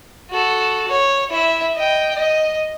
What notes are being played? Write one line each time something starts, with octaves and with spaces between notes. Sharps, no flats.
F#4 A4
C#5
E4 E5
D#5 G5
D#5